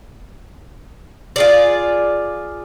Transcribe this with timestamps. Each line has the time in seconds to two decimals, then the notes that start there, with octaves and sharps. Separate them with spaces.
1.36 F4 G#4 D5